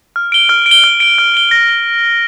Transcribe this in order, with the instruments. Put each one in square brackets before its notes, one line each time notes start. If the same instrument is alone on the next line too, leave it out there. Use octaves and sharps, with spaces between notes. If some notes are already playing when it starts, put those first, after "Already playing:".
[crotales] F6
D7 G7
F6
D7
G7
F6
D7 G7
F6
D7 G7
A#6
G7